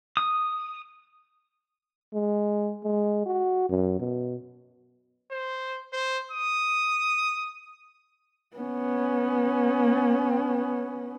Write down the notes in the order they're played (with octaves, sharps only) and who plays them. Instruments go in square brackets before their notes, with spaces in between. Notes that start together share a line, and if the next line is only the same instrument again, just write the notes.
[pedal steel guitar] D#6
[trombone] G#3
G#3
F#4
F#2
B2
[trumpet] C5
C5
D#6
[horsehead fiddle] B3 C#4